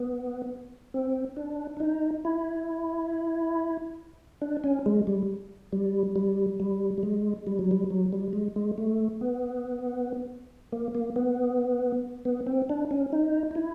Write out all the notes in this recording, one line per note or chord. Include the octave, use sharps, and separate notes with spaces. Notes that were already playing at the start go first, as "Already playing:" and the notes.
Already playing: B3
C4
D4
D4
D#4
E4
D4
C#4
G#3
G3
G3
G3
G3
G3
G#3
G3
F#3
G3
F#3
G3
G#3
G#3
A3
B3
A#3
A#3
B3
B3
C4
D4
C#4
D#4
D#4
E4